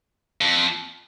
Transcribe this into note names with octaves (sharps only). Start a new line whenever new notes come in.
F2